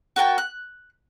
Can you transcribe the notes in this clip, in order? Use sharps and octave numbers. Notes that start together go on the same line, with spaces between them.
F#4 A#4 G5 A5
F#6